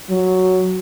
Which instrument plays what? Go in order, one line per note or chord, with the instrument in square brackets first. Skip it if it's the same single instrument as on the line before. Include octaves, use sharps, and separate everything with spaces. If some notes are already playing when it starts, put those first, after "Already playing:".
[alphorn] F#3